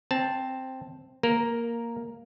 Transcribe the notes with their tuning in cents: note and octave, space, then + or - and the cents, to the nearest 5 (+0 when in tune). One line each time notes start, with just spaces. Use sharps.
C4 +0 A5 +0
A#3 +0 A#4 +0